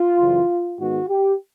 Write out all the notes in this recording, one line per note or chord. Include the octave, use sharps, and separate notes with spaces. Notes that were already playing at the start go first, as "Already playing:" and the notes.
Already playing: F4
F#2 C#3 E3
G#2 D#3 G#3 B3 F#4
G4